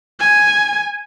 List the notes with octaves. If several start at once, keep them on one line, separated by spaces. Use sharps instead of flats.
G#5